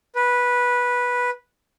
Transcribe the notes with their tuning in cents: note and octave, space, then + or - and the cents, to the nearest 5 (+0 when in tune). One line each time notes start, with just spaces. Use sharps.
B4 -10